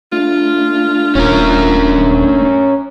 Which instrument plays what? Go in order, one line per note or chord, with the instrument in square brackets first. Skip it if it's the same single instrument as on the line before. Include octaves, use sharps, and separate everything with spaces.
[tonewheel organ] A3 D4 [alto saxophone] F4
[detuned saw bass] D#1 [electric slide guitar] C#4 A#4